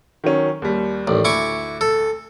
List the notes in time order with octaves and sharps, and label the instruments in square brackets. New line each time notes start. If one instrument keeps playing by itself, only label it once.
[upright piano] D#3 F#3 C#4
D#2 G3
[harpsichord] A1 [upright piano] D#3 D5
[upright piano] D2 [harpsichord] E4 C#6 D6
[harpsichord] A4